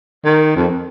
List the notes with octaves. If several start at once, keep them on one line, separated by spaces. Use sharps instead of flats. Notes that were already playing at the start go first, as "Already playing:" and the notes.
D#3
F2